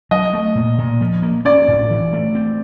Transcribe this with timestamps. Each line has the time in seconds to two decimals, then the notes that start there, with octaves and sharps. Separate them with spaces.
0.11 F#3 D#5
0.33 A3
0.55 A#2
0.78 A#2
1.01 F3
1.22 A#3
1.45 C#4 D5
1.68 A2
1.91 E3
2.13 A3
2.35 C4